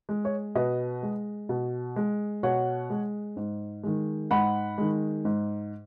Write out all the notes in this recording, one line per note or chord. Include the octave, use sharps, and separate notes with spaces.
G#3
C#5
B2 B4 D#5
G#3
B2
G#3
B2 C#5 F#5
G#3
G#2
D#3 G#3
G#2 F#5 B5
D#3 G#3
G#2